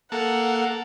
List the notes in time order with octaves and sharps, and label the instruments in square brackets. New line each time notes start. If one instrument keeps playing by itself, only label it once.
[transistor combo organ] A#3 A4 [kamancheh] F#5